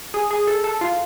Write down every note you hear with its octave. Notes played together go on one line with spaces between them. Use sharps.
G#4
G#4
A4
A4
F4